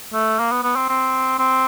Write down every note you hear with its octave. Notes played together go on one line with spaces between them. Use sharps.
A3
A#3
B3
B3
C4
C4
C4